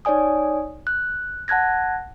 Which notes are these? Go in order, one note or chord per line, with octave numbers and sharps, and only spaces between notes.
D#4 C#5 D5 G#5 D#6
F#6
F#5 A5 F#6 G#6 A#6